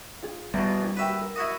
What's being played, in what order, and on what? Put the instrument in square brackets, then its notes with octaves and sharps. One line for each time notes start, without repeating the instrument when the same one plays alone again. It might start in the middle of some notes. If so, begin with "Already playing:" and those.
[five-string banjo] F4 G#4
[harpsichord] E2 B2 [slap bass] G3
[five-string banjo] A#3 E4 G#5
[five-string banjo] A#3 F#4 G4 [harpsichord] B4 E5
[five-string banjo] A#4
[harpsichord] E4 F#4 D#5